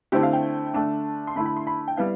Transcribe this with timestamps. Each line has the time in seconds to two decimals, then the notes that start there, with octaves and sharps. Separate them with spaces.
0.12 D3 A3 C4 E4 G4
0.23 F5
0.33 G5
0.74 D3 A3 D4 A5
1.27 C6
1.35 D3 A3 E4 B5
1.46 B5
1.57 C6
1.67 B5
1.88 G5
1.97 G3 B3 E4 F5